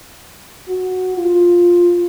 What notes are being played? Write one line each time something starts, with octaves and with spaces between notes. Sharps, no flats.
F#4
F4